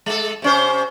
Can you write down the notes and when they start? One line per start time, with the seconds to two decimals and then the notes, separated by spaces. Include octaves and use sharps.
0.06 G#3 A4
0.42 C3 C#4 C5